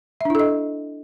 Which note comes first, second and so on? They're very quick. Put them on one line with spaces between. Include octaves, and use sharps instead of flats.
E5 D4 E4 A4 D#5